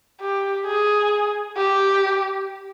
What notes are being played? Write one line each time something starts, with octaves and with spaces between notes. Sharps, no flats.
G4
G#4
G4